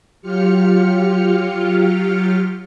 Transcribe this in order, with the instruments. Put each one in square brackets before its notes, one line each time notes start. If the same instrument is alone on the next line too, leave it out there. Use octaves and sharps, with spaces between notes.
[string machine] F#3 F4 G4 F6 C#7